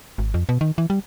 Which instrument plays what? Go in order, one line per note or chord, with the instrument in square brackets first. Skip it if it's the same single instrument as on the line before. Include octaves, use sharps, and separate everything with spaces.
[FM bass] G#1
F2
B2
D#3
E3
G3